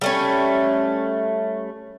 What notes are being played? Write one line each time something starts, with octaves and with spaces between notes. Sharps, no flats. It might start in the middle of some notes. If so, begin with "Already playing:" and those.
G3 A3 C#4